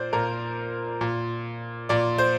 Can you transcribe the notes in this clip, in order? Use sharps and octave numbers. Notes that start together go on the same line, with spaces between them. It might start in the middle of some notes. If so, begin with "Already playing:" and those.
Already playing: A#2 C5 D5
A#2 A#4
A#2
A#2 D5
C5